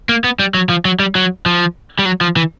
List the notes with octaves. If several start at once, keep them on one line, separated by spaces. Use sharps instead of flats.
A#3
B3
G3
F#3
F3
F#3
G3
F#3
F3
G3
F#3
F3
E3